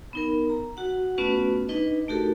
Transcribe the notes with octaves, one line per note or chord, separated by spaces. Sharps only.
B3 D#4 A#4
A#5
F#4 F#5
A3 B3 C#4 F4 F#4 B4
D4 D#4 B4 D#5
A3 D#4 F#4 G4 A4 A#4